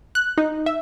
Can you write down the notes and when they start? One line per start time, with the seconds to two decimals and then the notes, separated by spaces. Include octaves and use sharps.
0.15 F#6
0.38 D#4
0.66 E5